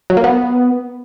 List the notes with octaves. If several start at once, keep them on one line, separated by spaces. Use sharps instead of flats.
F#3
A#3
B3